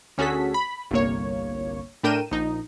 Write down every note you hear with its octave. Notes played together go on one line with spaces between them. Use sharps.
D2 C#4 F#4 G#4 A4 B6
B5
G1 C2 A#3 C#5
A2 D4 A#4 G5 D#7 E7
A#1 D#4